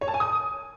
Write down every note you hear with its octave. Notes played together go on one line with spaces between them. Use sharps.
C#5
A5
G#5
D#6